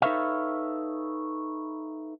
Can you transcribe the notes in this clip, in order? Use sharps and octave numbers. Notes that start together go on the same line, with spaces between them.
D#4 A4 B4 C#5 E5 F5